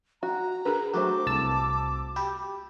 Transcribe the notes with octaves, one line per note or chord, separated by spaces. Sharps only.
F#4 A#5
D4 G#4 A#4 B4
F#3 A3 F#4 C5 D6
C2 A5 E6
G4 B5